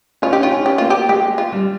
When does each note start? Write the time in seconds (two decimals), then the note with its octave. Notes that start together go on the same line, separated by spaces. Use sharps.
0.22 C#4 F4
0.31 D#4 G4
0.40 C#4
0.43 F4
0.52 C#4
0.66 G4
0.78 A#3 F4
0.90 G4
1.09 G#3 G4
1.38 F4
1.52 G3